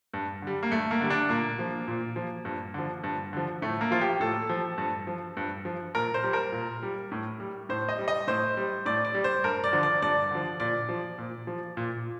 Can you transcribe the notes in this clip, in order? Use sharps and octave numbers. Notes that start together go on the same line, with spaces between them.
G2
D3 G3
A#3
G2 A3
A#3
D3 G3
D4
A#2 A#3
F3
A#2
F3
G2
D3 F3
G2
D3 F3
A2 A3
A#3
F3 F4
G4
A2 A4
F3
G2
F3
G2
F3
A#2 A#4
C5
G3
A#4
A#2
G3
A2
G3
A2 C5
D#5
G3
D#5
A2 C5
G3
A2 D5
D5
G3
C5
G2 A#4
D5
D3 F3
D5
G2 D5
D3 F3
A#2 D5
F3
A#2
F3
A#2